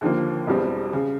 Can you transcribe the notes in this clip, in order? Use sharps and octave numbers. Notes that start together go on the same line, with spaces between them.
D#2 D3 F3 A#3
E1 E2 B2 G3 C4
C#3